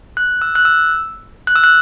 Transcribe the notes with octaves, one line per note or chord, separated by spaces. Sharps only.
F#6
E6
F#6
E6
F#6
E6
F#6